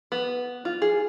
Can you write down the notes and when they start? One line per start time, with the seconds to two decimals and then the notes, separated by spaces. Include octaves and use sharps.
0.12 B3
0.65 F4
0.82 G#4